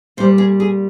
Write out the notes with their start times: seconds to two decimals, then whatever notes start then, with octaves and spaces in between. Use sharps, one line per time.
0.17 A#2 G3 C5
0.38 G#4
0.60 G#4